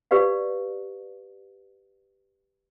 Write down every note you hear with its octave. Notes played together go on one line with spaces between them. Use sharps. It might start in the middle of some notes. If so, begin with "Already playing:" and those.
G4 B4 D5 F5